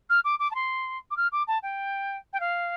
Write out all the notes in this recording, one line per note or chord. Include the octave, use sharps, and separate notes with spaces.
F6
D6
D6
A5
C6
D6
F6
D6
A5
G5
G5
F5